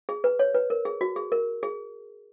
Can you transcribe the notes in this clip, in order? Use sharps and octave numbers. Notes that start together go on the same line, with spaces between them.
G#4
B4
C#5
B4
A#4
G#4
F#4
G#4
A#4
G#4